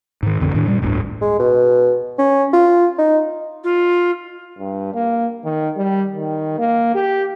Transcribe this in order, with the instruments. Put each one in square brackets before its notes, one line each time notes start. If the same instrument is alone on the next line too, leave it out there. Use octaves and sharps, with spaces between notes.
[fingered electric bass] G#2 D#3
A1 F2 D3 C4
A2 D#3 D4
A#2 G3
G1 D2 A2
[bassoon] G#3
B2
C#4
F4
D#4
[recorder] F4
[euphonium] G2
A#3
D#3
G3
D#3
A#3
G4